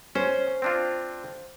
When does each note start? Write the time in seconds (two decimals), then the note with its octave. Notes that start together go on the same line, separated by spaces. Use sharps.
0.15 C#4 C5
0.62 C4 D4 F4